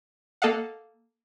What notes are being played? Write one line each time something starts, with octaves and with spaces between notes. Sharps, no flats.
A#3 A4 D#5 F5 F#5